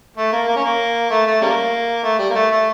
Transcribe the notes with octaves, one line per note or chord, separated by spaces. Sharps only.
A3
A#3
A#3
C#4
A#3
A3
A3
C#3 G3 A#3
A3
G3
A#3
A3
A3